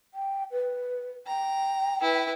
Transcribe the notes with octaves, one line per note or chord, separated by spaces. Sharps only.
G5
B4
G5 A#5
E4 B4